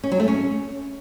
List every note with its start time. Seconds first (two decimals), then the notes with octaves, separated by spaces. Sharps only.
0.04 C#4
0.12 F#3
0.20 A3
0.28 C#4